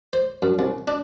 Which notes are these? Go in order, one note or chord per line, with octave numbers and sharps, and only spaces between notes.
C5
F#2
C2
D4